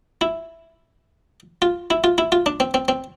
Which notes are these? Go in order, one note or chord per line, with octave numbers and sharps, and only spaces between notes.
E4
F4
E4
F4
E4
F4
D4
C4
C4
C4